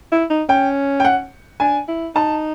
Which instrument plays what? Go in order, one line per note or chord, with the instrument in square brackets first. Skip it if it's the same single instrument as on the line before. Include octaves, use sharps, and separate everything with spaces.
[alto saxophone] E4
D#4
[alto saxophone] C#4 [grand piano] G5
[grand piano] G5
F#5
[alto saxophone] D4 [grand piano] G#5
[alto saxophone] E4
[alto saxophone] D#4 [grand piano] A5